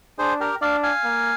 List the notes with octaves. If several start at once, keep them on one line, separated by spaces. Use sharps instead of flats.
D4 G#4 C5
G4 A#4
D4 D5 F5
F5 G#5
A#3